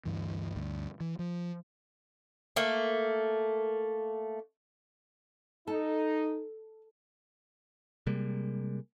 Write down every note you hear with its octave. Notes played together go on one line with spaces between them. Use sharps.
D2 G2 E3
D2 G2
E3
F3
A3 A#3
D#4 A4
C3 G3 G#3 A#3